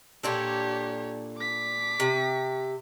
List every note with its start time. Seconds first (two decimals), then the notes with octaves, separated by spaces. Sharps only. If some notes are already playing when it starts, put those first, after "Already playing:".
0.23 A#2 D4 G4 A4 C#5
1.37 D6 B6
2.00 C3